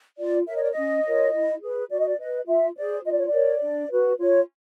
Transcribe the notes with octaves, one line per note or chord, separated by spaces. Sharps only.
F4 D5
A#4 C#5 E5
D#5
D5
D#5
C#4
F4 A#4 C#5
E4
G#4 B4
F#4 D5
D#5
D5
B4 D#5
F4 E5
G#4 C5 D5
F4 D#5
D5
C#5
D5
A#4 C#5
D4
F#4 B4
F4 C#5